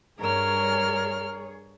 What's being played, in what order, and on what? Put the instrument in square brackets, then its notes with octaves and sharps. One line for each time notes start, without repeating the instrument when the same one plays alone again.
[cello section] G2 G#4 C#5 [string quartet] A#4 F6